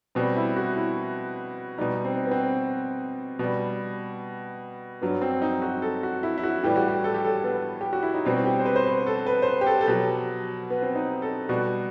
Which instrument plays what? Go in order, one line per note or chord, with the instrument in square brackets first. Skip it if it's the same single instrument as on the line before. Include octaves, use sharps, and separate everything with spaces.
[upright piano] B2 G3 C4
E4
F#4
E4
B2 G3 D#4
C4
B3
C4
B2 G3
G2 F#3 B3
C4
D#4
F#4
A4
F#4
E4
E4
F#4
A2 E3 G3 G4
F#4
G4
A4
G4
A4
B3
G4
F#4
E4
D#4
B2 G3 C4
G4
C5
B4
C5
B4
A4
B4
C5
B4
G4
A4
A4
B2 F#3 G4
B3
C4
D#4
A4
B2 G3 F#4